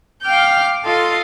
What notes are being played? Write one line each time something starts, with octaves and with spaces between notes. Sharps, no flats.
F5 G5 D6 F6 G6
F4 A4 D#5 F5 C6